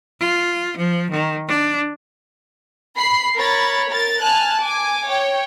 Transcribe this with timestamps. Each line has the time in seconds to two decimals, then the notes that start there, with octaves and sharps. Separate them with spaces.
0.20 F4
0.77 F3
1.11 D#3
1.48 D4
2.97 B5 C7
3.36 A#4 C#5 B5 A6
3.88 A#4 A6
4.23 G#5 A5 F6 F#6
4.61 G#5 D6
5.10 C#5 G5